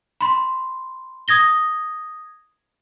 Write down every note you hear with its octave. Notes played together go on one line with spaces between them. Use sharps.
B5 C6
D#6 G#6 A#6 G7